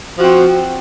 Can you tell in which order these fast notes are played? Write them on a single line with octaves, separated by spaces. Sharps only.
F3 F#4 C4